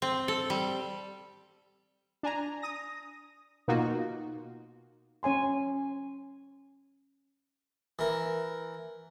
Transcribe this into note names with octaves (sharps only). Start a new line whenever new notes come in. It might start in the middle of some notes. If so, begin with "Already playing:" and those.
C4
A4
G3
D4 G#5 A#5
D#6 A#6
B2 A#3 D#4 F4 F#4
C#4 C#5 G#5 C6
E3 A#4